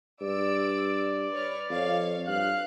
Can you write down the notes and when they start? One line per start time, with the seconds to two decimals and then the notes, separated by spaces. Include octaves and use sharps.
0.21 G2 D5 E6 D7
1.32 B4 C#5 F6
1.70 F2 C#5 F5
2.27 G2 F5 F#6